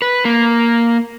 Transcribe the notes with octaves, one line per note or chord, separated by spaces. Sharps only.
B4
A#3